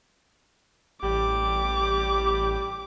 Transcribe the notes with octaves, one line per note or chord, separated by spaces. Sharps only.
A1 G3 G4 D6